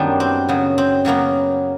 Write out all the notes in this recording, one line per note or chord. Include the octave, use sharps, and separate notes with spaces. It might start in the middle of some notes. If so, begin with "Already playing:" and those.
Already playing: F#2 D#3 G3 B3 D4
C4
C#3 F#3 B3
C4
C#3 F#3 A#3 B3